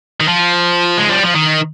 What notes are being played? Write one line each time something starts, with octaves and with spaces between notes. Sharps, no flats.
D#3
F3
G#3
G3
F3
D#3